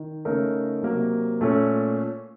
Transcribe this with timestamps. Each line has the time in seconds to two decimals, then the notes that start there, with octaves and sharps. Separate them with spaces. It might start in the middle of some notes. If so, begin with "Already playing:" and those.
Already playing: D#3
0.25 C#3 A3 D#4 A#4
0.83 C3 F#3 A#3
1.41 A#2 A3 C#4 A4